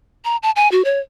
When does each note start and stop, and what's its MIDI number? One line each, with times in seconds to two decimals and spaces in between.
0.25 0.37 82
0.43 0.51 81
0.56 0.70 80
0.72 0.84 66
0.85 0.99 73